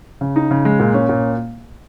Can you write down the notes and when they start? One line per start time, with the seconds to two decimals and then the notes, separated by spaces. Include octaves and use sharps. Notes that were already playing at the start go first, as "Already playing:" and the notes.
0.21 C#3
0.36 D#4
0.51 C#3
0.65 G#3
0.80 A#2
0.94 C#4
1.09 A#2